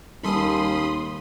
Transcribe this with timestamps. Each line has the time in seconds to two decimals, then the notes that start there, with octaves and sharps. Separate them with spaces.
0.23 D#2 G3 C#4 A4 B5 C6 D#6